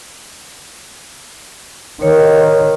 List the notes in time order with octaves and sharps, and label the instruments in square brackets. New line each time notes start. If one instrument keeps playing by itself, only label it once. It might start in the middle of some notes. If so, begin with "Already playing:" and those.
[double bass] D#3 [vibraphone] C#5